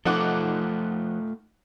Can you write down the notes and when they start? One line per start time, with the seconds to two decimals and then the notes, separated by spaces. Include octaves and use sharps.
0.05 F3 A3 D#4 F4 A4 F#5 D6